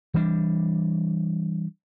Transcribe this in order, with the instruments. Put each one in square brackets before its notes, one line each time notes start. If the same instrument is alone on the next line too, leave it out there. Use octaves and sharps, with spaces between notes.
[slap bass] E3 G3 D4